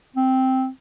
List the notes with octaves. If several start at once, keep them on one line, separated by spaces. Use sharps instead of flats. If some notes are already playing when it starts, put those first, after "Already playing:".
C4